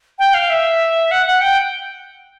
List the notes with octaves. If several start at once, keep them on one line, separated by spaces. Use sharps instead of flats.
G5
F5
E5
F#5
F#5
G5